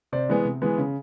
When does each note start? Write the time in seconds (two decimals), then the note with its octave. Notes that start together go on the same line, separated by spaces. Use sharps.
0.12 C3 C5 D5
0.29 E3 G#3 B3
0.45 C3
0.62 E3 G#3 B3
0.78 C#3